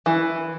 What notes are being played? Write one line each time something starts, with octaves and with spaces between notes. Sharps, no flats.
E3